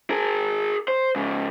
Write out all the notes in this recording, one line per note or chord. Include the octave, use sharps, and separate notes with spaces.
G#4 A#4
C5
G#2 C#3